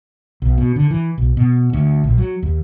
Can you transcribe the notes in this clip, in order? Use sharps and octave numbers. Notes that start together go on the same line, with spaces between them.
B1
B2
D3
E3
B1
B2
D2
A#1
F#3
D#2